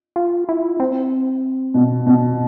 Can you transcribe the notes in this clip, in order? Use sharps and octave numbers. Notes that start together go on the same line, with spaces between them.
F4
E4
C4
B2
B2